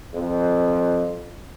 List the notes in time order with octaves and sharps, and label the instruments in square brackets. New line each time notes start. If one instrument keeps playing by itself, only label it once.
[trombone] F2